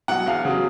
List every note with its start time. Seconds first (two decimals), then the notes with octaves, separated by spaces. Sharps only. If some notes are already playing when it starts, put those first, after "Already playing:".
0.08 B2 F#3 F#5
0.26 E2 F5
0.45 C#3 F#3